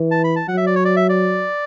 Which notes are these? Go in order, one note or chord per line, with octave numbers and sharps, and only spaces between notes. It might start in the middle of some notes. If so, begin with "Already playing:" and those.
Already playing: E3
A5
B5
A5
F#3 F#5
E5
D5
C#5
D5
E5
D5